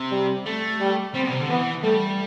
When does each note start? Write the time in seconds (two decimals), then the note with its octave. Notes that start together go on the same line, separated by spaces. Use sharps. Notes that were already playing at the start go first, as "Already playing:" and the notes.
Already playing: C3
0.11 G3
0.46 A3
0.80 G3
1.15 G3 C4
1.24 B2
1.32 C3
1.40 D3
1.49 E3 B3
1.83 G3 A3